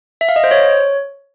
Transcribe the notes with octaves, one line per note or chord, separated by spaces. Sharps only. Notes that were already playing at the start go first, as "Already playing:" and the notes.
E5
F5
D#5
C5
C#5